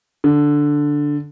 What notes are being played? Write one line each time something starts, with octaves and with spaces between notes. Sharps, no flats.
D3